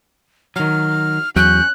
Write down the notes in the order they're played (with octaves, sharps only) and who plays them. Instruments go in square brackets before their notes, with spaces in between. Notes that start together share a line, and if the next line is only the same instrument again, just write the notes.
[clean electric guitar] D#3 F#3 [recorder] F6
[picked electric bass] E2 F#3 [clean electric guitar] C#4 [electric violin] F#6 [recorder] G6